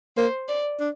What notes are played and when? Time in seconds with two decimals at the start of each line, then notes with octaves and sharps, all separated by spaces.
0.17 A#3 C5
0.48 D5
0.80 D4